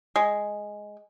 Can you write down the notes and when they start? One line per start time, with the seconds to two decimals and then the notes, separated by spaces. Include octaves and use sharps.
0.16 G#3